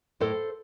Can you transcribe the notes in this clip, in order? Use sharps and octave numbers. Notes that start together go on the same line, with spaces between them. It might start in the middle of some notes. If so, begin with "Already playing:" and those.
A2 A4 C5